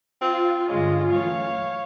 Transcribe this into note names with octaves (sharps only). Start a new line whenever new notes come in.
C4 F4
G2 D3 G#3 C#4 D#5
E3 F#3 A3 C#5 F5